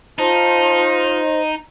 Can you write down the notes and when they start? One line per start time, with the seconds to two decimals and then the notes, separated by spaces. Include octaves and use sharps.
0.19 D#4 F4 C5 A5
1.21 D#5